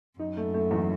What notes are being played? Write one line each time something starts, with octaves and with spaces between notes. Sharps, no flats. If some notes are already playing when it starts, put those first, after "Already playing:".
F#2 D#4
A3
A3
E2